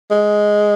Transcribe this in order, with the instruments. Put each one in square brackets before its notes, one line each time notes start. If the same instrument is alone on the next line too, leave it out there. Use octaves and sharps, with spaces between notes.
[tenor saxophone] G#3